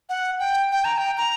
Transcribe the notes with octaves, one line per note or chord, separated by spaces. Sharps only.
F#5
G5
G5
A#5
G5
A#5